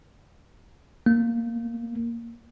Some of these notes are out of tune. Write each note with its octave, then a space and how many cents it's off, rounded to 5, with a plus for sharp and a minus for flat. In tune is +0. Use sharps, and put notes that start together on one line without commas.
A#3 -5